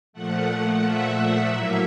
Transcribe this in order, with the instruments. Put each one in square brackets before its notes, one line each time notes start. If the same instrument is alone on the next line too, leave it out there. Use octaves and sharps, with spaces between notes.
[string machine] A#2 F3 A3 F#5
E5
A2 F#3 A#3